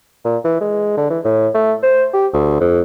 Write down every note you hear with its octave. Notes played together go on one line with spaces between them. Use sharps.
A#2
E3
G#3
D3
E3
A2
A3
C5
G4
D2
F2